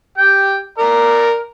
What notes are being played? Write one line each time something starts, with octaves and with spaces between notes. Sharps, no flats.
G4 G5
A#4 D5 A#5